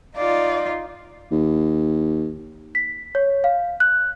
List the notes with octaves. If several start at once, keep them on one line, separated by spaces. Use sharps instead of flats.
D#4 F4 D5
D#2
B6
C#5
F5
F#6